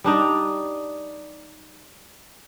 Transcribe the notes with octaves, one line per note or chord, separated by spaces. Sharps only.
G3 D4 D#4